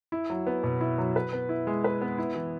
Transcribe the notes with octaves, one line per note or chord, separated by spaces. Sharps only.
E4
F#3
B3
B2
E4
F#3
B4
B3
E4
G#3
B4
B3
E4
E3